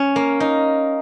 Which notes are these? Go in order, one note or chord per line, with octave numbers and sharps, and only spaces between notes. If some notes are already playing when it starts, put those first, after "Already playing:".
Already playing: C#4
A#3
D#4